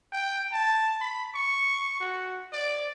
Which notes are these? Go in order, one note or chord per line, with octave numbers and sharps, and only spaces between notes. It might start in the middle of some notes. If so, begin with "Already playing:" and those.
G5
A5
B5
C#6
F#4
D5